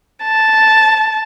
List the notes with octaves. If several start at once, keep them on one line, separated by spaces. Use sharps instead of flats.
A5